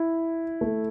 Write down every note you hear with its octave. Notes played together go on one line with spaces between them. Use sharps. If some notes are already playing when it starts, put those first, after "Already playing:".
Already playing: E4
A3